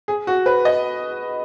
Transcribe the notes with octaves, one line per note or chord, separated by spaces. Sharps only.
G#4
F#4
B4
D#5